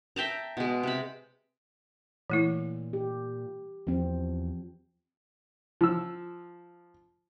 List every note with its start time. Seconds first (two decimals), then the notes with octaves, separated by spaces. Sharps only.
0.16 E5 G5 A5 A#5
0.57 B2 G#3
0.83 C3 B5
2.30 A#2 E3 A3 E4
2.93 G4
3.87 E2 F3 C4
5.81 F3 E6